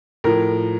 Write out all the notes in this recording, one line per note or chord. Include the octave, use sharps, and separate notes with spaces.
A2 F3 A#4